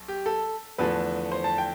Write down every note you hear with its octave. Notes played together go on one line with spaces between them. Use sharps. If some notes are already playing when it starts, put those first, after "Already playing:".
Already playing: B1
G4
A4
E2 D3 F3 A3 B4
C5
A5
G5